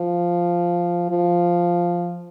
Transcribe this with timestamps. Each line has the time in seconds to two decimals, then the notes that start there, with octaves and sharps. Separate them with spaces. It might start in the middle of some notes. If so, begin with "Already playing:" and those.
Already playing: F3
1.10 F3